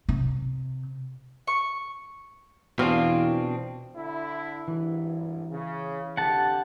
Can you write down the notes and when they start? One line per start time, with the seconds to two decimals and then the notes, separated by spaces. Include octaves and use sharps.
0.09 C3
1.47 C#6
2.79 E2 B2 C4 D4 F4 G#4
3.96 D3 E4
4.68 G#1 G2 E3
5.51 C#3
6.17 F2 D3 G4 F#5 A5